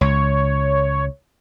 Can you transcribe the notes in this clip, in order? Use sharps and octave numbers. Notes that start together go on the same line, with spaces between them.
C#2 C#5